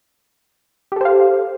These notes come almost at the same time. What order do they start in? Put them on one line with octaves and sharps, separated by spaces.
G4 A4 C5 F5